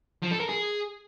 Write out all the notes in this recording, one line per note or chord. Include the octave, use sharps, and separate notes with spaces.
F3
A4
A#4
G#4